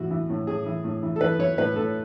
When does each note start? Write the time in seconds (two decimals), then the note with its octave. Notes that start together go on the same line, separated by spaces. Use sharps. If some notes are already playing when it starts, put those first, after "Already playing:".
Already playing: A2 E3 F#4
0.10 E3
0.29 A2
0.47 A2 G#4
0.66 E3
0.84 A2
1.03 E3
1.16 A4
1.21 E3 B4
1.39 E3 C#5
1.58 A2 B4
1.76 A2 A4